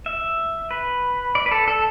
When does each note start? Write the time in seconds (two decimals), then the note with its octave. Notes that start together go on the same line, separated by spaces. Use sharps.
0.06 E5
0.71 B4
1.35 D5
1.46 B4
1.51 A4
1.68 A4